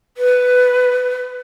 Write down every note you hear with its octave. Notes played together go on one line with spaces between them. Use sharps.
B4